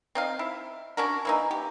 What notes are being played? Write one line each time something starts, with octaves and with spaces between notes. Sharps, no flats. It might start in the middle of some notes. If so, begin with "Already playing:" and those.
C4 D#4 F5
E4
C#4 D4 F#4 A#4
E3 A#3 D#4
G4